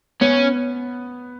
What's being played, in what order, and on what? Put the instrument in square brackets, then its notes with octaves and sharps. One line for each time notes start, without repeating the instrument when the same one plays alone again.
[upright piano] B3 [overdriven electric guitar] C#4